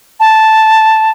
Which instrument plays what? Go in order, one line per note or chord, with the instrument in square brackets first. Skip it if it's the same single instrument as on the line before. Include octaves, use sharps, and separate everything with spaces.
[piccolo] A5